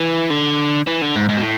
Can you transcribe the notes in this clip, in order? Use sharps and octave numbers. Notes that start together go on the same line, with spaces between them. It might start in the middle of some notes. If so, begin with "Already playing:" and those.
Already playing: E3
D3
E3
D3
G#2
G#2
B2
A2